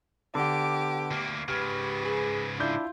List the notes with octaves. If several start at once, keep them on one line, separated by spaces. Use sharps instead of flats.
D3 B3 G4 D6
D2 A#3
G#2 C#3 G4 B4 B5 F6
G#4
D4 E4 F4 G6